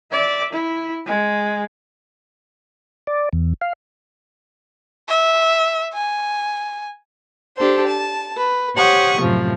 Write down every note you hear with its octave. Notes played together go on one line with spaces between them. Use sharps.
D5 E5
E4
G#3
D5
E2
F5
E5
G#5
D4 G4 A4 C5
A5
B4
G4 C5 C#5 F#5 C#6 D#6
F#2 A2 C3 F3